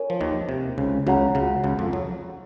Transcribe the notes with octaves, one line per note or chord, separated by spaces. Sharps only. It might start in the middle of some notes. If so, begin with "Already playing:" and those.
Already playing: A#4 C#5 G#5
F3
D#2 D#3
C3
C#2 C#3
C#2 C#3 F#4 C#5 F#5 A#5
C#2 C#3
C#2 C#3
F2 F3
F#3